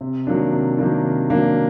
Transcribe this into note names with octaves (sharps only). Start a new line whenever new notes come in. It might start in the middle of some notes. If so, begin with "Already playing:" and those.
C3
D#3 F#3 A#3 D4
C3
D#3 F#3 A#3 D4
C3
D#3 F#3 A#3 D4